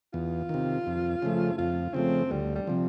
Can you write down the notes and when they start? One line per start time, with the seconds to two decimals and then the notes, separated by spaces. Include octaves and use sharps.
0.13 E2 F4
0.49 C3 D#3
0.87 F2
1.22 C#3 F3 A3
1.58 F2 F4
1.94 C#3 F3 A3 C4
2.31 D2 G3
2.55 G3
2.67 C3 F3